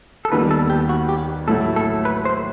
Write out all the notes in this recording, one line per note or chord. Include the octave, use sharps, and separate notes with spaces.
A4
D#2 D#3 G3 B3 B4
A4
G4
F#4
G4
A1 A2 F#3 A3 E4 A4
A4
B4
C5